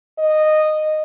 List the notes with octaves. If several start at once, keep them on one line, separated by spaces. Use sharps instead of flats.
D#5